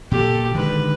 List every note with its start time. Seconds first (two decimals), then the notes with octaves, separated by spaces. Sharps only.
0.11 A#2 G4 A4
0.54 D3 D#3 G#3 B4